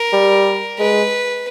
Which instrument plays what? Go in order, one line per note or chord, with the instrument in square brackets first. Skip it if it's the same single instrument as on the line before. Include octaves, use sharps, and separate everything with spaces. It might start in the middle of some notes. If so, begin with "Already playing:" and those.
Already playing: [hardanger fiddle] A#4
[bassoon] G3
[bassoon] G#3 [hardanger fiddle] B4